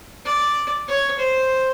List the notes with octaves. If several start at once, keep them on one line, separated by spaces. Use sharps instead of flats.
D5
C#5
C5